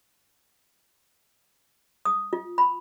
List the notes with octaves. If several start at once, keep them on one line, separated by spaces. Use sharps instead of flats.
D#6
F4
B5